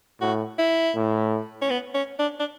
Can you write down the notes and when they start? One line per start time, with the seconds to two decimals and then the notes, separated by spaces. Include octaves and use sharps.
0.21 A2 F#4
0.59 E4
0.96 A2
1.62 C#4
1.70 B3
1.94 C#4
2.19 D4
2.40 D4